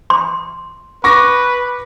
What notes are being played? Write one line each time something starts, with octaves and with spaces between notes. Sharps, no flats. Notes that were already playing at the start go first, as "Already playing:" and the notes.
C6
B4 C#6 D6 A#6